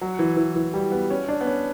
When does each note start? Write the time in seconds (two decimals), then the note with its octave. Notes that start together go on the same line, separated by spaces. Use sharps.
0.01 F#3
0.19 E3
0.37 E3
0.56 E3
0.74 G3
0.92 B3
1.10 C#4
1.29 D4
1.41 B3
1.47 C#4